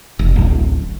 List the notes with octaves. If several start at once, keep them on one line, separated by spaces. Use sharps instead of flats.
F1
D1 A1